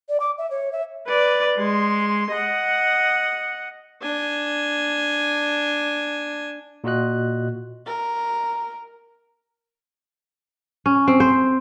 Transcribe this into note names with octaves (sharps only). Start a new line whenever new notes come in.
D5
D6
E5
C#5
E5
B4 D5
G#3 C6
D#5 F#5
D4 G#5
A#2 F4 F#4 D#5 F#6
A#4
C#4
C4
C5